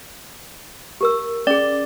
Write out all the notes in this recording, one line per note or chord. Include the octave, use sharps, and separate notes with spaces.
G4 A#4 E6
C#4 G#4 D5